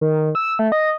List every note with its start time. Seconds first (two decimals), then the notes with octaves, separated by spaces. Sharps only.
0.01 D#3
0.35 E6
0.59 A3
0.72 D#5